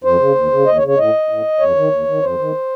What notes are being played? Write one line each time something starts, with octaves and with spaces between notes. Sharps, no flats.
F2 C5
C#3
D#2
C#3
D#2 D#5
C#5
C#3
C#5
A2 D#5
A2
F2 C#5
D#3
D#2
D#3
F2 C5
D#3